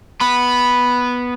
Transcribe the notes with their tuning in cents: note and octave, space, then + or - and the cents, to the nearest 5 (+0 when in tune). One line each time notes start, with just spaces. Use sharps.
B3 -5 B5 +0